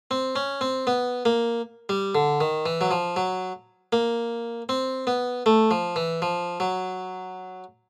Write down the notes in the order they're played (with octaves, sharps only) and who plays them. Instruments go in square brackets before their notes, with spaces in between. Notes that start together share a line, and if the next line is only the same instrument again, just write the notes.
[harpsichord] C4
C#4
C4
B3
A#3
G3
D3
D#3
E3
F#3
F3
F#3
A#3
C4
B3
A3
F3
E3
F3
F#3